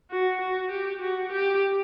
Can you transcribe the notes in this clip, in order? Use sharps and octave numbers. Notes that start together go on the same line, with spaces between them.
F#4
F#4
G4
F#4
G4